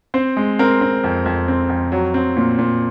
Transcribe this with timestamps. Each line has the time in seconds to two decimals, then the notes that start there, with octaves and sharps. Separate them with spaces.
0.14 C4 C5
0.37 G#3
0.59 C4 A#4
0.81 C4
1.04 F2
1.26 F2
1.48 C4
1.69 F2
1.92 F#3
2.14 C4
2.37 A#2
2.59 A#2